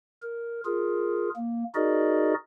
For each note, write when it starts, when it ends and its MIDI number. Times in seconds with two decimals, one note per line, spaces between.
0.22 0.61 70
0.65 1.30 65
0.65 1.30 68
0.65 1.30 70
1.36 1.64 58
1.75 2.34 63
1.75 2.34 66
1.75 2.34 68
1.75 2.34 70
1.75 2.34 74
1.75 2.34 75